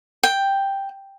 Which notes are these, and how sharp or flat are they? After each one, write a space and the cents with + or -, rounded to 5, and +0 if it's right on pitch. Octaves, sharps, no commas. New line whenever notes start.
G5 +5